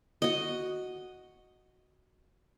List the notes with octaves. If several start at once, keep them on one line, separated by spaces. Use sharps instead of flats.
F#4 D#5